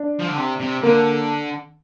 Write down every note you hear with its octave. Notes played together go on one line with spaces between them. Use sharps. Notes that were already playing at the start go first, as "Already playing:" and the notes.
Already playing: D4
F3
D3
C3
C3
D3 A#3